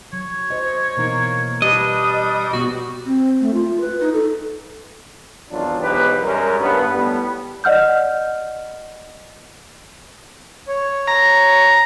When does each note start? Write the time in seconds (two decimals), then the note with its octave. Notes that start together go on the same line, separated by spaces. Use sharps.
0.13 F#3 C#5
0.50 C5 D#5
0.97 B2 E3 A#3 D#4
1.62 G3 D4 G4 B4 D#5
2.53 B2 B3 F#4 G4
3.06 C4
3.41 A3
3.54 F4
3.81 B4
4.01 D#4
4.13 A4
5.50 G#1 E2 F#3 D4 F4
5.81 B1 E2 G#2 G4 B4
6.21 F#2 G3 G#3 C#4 A#4
6.59 G#1 G2 B3
6.91 A2 G3 B3
7.64 D5 D#5 F#5 F6 G6
10.68 C#5
11.07 A#5